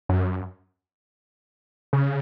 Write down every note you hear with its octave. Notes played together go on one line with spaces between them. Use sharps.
F#2
C#3